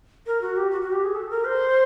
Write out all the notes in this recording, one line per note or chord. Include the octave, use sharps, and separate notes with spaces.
A#4
F#4
G4
F#4
F#4
G4
G#4
A4
A#4
C5